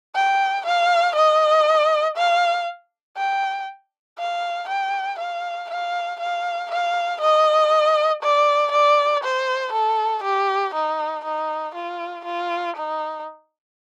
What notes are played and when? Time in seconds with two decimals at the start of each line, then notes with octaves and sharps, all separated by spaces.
0.15 G5
0.65 F5
1.16 D#5
2.17 F5
3.17 G5
4.19 F5
4.68 G5
5.19 F5
5.70 F5
6.20 F5
6.71 F5
7.21 D#5
8.22 D5
8.72 D5
9.23 C5
9.72 A4
10.23 G4
10.74 D#4
11.24 D#4
11.75 F4
12.25 F4
12.76 D#4